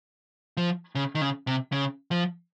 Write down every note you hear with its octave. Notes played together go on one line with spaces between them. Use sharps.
F3
C#3
D#3
C#3
C3
C#3
F3